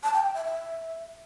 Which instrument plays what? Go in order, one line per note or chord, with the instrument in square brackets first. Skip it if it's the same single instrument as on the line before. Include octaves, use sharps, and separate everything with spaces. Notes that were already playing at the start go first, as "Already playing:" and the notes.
[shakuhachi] A5
G5
G5
E5
E5